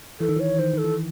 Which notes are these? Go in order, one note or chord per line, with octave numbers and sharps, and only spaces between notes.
E3 A4
D#3
E3 C#5
D#3 C5
D#3 A4
E3